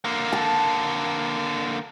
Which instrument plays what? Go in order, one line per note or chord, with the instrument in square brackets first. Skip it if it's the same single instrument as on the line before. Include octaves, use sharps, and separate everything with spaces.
[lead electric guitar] D3 A#3
[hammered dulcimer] A5